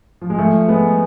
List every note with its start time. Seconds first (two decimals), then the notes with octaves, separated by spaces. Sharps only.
0.22 F3
0.30 G#3
0.39 F3 A3
0.68 G#3 B3